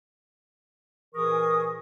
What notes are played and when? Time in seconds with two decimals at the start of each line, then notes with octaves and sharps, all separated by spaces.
1.14 A#2 E3 G#4 A#4 C#6 D#6